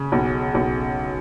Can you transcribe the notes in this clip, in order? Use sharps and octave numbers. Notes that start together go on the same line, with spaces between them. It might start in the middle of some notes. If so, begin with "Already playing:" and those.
Already playing: C#3
B1
B1